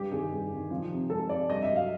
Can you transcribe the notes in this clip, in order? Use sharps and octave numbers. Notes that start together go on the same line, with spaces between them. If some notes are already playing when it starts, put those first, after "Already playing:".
Already playing: G2 G4
D#3 G#4
G2
D#3
F3
C3
G#3 A4
C3 D5
G2 D#5
E5
F#3
F5